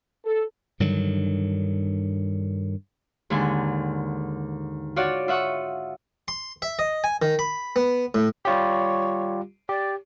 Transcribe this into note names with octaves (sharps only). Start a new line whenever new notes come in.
A4
G2 D3 D#3 F#3
D#2 G#2 D3 G#5
F4 F#4 C#5 D5 F#5
F4 E5 F#5 C#6 D#6
C6
E5
D#5
G#5
D#3
B5
B3
A2
G3 F4 G4 C#5
G4 D5